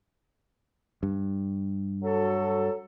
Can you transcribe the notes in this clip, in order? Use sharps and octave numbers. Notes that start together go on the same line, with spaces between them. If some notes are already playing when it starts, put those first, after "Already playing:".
G2
F#3 F#4 A4